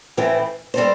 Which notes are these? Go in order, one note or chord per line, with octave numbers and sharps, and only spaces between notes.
A2 E3 A3 C4 E4
G3 C4 A4 C5